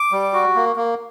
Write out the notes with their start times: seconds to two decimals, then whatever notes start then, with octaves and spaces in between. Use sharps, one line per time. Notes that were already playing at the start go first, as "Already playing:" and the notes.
Already playing: D6
0.12 G3
0.33 F#4
0.56 A#3
0.76 A#3